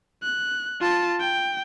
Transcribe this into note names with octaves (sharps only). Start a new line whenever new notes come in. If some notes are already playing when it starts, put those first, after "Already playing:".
F#6
F4 A5
G5